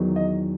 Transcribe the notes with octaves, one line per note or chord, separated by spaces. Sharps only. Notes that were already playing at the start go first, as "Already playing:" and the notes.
Already playing: E2 D#3 F#3
D#5